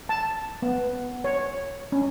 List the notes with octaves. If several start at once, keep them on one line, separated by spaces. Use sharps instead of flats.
A5
B3
C#5
C#4